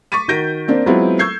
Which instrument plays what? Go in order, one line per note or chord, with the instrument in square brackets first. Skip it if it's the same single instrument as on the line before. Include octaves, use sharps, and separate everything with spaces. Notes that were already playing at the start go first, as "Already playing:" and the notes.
[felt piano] C#6 D6 A6 B6 D#7
D#3 F#4 G6 A#6 D7
A#3 C4 D4
F#3 G#3 B3 C4 E4 F4
C#6 E6 G6 G#6 C7